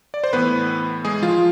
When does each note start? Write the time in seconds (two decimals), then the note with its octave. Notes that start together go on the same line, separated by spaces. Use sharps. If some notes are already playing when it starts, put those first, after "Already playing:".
0.14 D5
0.24 C5
0.33 A2 E3 B3 B4
1.05 G#3 G#4
1.23 F3 F4